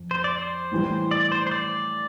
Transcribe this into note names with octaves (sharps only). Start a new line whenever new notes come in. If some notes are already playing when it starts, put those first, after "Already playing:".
Already playing: F2
C5
D5
C5
A2 E3 G3
D5
C5
C5
D5